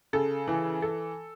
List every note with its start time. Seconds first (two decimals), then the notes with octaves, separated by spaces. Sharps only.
0.13 C#3 A4
0.48 E3
0.82 A4